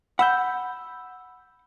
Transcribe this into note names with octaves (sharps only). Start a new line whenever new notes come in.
F#5 B5 E6 G6